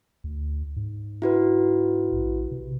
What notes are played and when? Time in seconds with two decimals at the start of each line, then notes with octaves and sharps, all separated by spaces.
0.24 D2
0.76 G#2
1.22 E4 F#4 B4
2.13 A#1
2.51 C3